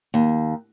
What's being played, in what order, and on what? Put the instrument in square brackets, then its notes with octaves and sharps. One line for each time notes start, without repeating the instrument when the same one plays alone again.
[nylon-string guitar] D#2